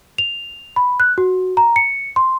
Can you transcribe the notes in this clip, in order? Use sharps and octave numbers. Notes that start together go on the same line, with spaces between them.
F7
B5
F#6
F#4
A#5
C#7
C6